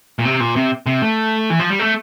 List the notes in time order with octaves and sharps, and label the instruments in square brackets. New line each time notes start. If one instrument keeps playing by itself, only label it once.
[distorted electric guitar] A#2
C3
A#2
C3
C3
A3
E3
F3
G3
A3